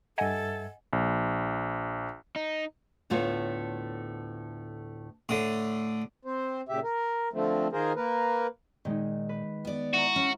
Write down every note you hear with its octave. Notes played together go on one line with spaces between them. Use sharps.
G2 A4 D#5 E5 F#5 G#5 G#6
A#1
D#4
D2 A2 A3 B3 F4 C#5
A2 D3 D#6
C4 C5
A#2 C#3 G4 E5
A#4
D3 F3 A3 C4
D#3 F4 G#4 A#4 C5
A#3 A#4 B4
A#2 D#3 G#3 D#4
B4
B3 D5
E4 F#4 A#5
C#4